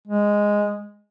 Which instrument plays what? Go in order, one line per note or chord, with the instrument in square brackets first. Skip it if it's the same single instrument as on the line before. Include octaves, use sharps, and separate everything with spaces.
[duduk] G#3